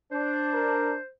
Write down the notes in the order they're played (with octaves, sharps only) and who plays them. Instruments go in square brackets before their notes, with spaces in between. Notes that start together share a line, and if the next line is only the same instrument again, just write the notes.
[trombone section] D4 [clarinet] C5
[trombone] A#4